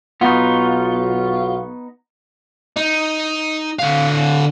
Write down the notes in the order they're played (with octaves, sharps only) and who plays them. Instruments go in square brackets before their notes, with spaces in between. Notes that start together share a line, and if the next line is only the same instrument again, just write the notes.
[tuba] B1 [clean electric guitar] B3 D#4 [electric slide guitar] F4 [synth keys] F#5 C#6
[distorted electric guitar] D#4
D3 F5